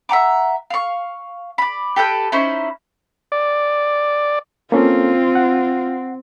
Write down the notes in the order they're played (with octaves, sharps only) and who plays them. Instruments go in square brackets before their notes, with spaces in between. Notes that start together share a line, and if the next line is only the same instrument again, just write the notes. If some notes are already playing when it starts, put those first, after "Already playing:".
[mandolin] E5 F#5 A#5 D6
F5 C#6
D5 B5
G4 A4 B4 G5
C#4 D#4 E4 C5
[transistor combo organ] D5
[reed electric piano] A#3 C#4 A4 [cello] C4 [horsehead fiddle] F4
[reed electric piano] F#5